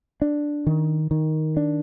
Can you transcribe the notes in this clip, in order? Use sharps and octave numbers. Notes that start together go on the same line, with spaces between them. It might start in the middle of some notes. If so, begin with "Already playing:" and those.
D4
D#3
D#3
D4